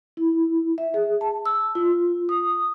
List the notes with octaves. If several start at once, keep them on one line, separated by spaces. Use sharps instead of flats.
E4
E5
G#4
A5
E6
F4
D#6